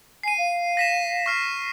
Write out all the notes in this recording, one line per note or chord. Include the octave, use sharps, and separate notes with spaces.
G#5 C7 D#7
F5
A#6 B6 E7
C#6 F6 C7